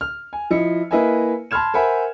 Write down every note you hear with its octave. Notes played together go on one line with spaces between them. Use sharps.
F6
G#5
F3 E4 D#5 C#7
A#3 E4 B4 D#5 E5 G#5
A5 B5 C6 F6 G#6 E7
A#4 C5 E5 F#5 G#5 B5